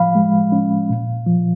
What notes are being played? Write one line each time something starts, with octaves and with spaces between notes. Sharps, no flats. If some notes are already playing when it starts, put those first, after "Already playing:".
Already playing: A2 F3 F5 B5
G#3
C#4
A#2
F3